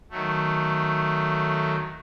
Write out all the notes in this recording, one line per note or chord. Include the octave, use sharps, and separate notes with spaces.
D#3 F#3 A3